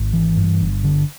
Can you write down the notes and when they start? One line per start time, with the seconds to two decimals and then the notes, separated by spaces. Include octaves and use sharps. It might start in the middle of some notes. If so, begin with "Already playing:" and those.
Already playing: G#1
0.13 E3
0.37 G2
0.61 G1
0.84 D3